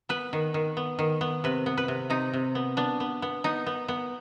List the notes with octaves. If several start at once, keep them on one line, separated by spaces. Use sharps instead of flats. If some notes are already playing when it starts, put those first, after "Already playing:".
B3 B4
D#3
D#3
B3
D#3
B3
C3 B4
B3
B4
C3
C3 D#4
C3
B3
B3 D4
B3
B3
B3 D#4
B3
B3